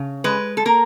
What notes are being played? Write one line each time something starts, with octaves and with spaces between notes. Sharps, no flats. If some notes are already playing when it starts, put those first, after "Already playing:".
Already playing: C#3
G#3 B4
A4
A#3 A#4